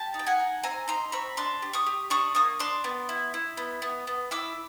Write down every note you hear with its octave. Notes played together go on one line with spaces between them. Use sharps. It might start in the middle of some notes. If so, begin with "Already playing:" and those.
Already playing: G4 A5
D#4
G5
F#5 G#5
D#4
C4 G#5 A#5
D#4 A#5 C6
C4 B5 C#6
D4 C6 D6
G4
C#6 D#6
G4
D4 C#6 D#6
A#3 C#6 D#6
D4 C6 D6
B3
E4
E4
B3
B3
B3
E4 D6 E6